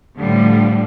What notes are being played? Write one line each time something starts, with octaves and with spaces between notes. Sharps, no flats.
A2 D3 F3 G3